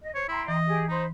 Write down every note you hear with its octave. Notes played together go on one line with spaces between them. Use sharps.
D#5
C5 C#5
E4 G5 A#5 C6
E3 D#5
G4 G#4
D#4 C5 B5 C6